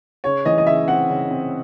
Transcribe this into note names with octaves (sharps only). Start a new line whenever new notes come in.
C#3 C#5
E3 D#5
D#5
C#3 E5
C4 F#5
C#3
C4